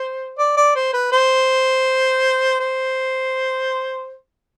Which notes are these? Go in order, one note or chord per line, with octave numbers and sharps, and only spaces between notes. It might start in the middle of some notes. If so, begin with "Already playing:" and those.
Already playing: C5
D5
D5
C5
B4
C5
C5